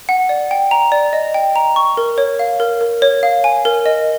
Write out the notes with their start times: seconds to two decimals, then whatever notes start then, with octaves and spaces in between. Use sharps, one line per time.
0.09 F#5
0.29 D5
0.51 G5
0.71 A#5
0.92 D5
1.13 D#5
1.34 G5
1.56 A#5
1.76 C#6
1.97 A#4
2.18 C#5
2.39 F5
2.60 A#4
2.81 A#4
3.02 C#5
3.23 F5
3.44 G#5
3.65 A#4
3.86 D#5